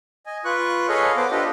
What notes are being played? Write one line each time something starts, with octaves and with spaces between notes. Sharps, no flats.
D#5 G#5
F4 B4 C#6 F#6
G#4 A4 B4 C#5 D#5 F5
B3 B4 C5 D6
D4 F4 G4 A4 B4 D#5